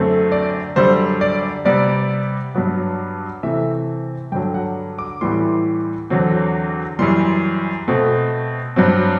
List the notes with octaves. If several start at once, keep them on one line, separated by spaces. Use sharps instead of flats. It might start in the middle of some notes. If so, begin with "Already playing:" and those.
Already playing: F#2 D3 A3 C4
D5
F#2 D3 G3 C5
D5
C3 G3 B3 D5
G2 F#3 B3
C3 E3 A3 C4 E5
G2 D3 F#3 G5
F#5
D6
A2 E3 G3 B3 C6
E2 D3 F#3 C4
F#2 E3 G3 C6
B2 A3 C4
G2 F#3 C4